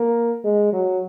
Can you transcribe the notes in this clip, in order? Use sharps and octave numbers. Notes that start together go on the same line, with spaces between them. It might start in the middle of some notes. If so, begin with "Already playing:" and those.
Already playing: A#3
G#3
F#3